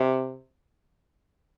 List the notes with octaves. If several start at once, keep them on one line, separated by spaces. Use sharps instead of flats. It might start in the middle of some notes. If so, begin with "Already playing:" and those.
Already playing: C3